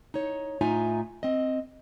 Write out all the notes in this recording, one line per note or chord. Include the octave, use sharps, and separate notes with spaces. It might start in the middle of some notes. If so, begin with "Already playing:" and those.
D#4 C#5
A2 D#4 F4 E5 G#5 A#5
C4 D#5